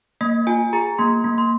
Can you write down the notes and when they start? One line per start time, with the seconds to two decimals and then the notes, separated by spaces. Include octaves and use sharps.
0.21 A#3 D#5
0.47 F4 G#5
0.73 G#4 A#5
0.99 A#3 C6
1.24 A#3
1.38 C6